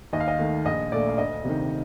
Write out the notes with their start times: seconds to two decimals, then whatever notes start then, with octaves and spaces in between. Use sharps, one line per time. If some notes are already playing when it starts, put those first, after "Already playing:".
0.13 D#2 D#5
0.20 F5
0.28 D#5
0.39 D#3 A3
0.65 A#1 D#5
0.92 A#2 A3 D5
1.08 F5
1.18 D2 D#5
1.45 C3 D#3